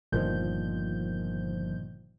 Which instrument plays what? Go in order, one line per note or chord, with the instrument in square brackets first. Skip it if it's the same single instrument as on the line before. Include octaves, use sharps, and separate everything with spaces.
[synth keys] G1 A#2 D#3 F3 G6